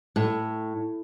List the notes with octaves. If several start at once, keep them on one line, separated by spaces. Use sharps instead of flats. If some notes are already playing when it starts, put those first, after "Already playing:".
A2